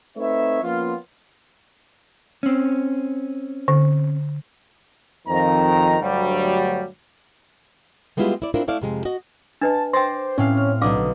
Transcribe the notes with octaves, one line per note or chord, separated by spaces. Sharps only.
A3 C4 D#4 B4 C#5 E5
F3 A#3 B3 C#4 F4
C4 C#4
D3
F2 D#3 A#5
D2 G2 F#3 G3
G3 G#3 B3 E4 F4 G4
E4 D5
C4 D4 E4 F4 A#4
A3 E4 D5 F5
F2 C3 G#3
F#4 D#5
D4 B4 D#5 A5
C5 G5 C6 D6 A6 A#6
A2 C4 C#4 F5
F6
B1 D3 B4 F5 D6 D#6